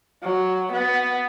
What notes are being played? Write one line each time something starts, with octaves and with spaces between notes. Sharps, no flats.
F#3
B3